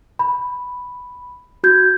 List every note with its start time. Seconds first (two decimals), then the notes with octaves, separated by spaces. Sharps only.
0.19 B5
1.64 F#4 G6 G#6